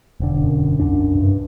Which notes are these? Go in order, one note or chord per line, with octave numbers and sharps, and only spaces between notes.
E1 D3
F#2
C2 D4
G2